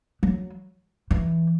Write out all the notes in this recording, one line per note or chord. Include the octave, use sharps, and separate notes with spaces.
F#3
E3